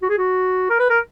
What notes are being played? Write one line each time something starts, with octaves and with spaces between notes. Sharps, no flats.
F#4
G#4
F#4
A#4
B4
A#4